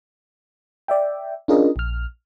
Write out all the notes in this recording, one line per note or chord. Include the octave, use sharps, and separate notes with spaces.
D5 E5 G5
C#4 D4 F4 G#4 A#4 D#5
A#1 F6